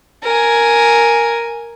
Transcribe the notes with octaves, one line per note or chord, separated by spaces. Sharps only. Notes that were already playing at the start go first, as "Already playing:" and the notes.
A#4 G#5